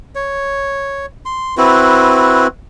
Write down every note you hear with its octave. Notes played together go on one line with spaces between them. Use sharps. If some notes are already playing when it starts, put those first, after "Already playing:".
C#5
C6
C4 E4 F#4 B4